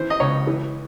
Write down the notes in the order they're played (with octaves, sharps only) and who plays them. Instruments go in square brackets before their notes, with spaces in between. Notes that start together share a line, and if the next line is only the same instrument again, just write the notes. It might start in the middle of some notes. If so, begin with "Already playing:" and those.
Already playing: [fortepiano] E3 C5
D#5
C#2 C#5
E3